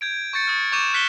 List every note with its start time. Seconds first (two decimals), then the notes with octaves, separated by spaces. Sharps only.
0.01 G6 G#6 D7
0.33 C#6 G6 A6 C#7
0.46 D#6 F6 C#7
0.72 C#6 D6 G6 D#7 E7
0.93 F6 F#6 B6 C#7 E7 G7